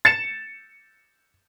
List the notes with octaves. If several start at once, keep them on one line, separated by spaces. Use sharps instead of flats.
A6 C#7 E7